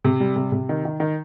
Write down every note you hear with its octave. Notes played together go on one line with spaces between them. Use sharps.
C3
G3
C3
C3
D#3
D#3
D#3